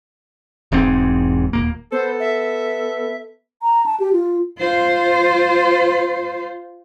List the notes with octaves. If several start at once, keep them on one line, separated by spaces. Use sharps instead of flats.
E1 E2 G#2 C4
D#1 F2 A#3
B3 A4 C5
E5
A#5
A5
G4
F4
F4 C5